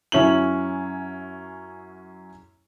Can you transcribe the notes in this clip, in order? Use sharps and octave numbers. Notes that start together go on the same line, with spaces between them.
F#2 C#4 E4 F#7